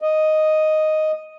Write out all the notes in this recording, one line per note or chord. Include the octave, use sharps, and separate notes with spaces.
D#5